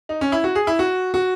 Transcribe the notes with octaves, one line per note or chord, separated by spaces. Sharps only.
D#4
C#4
E4
F#4
G#4
E4
F#4
F#4